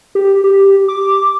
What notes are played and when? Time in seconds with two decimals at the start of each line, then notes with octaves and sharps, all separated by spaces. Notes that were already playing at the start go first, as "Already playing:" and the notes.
0.15 G4
0.44 G4
0.88 D6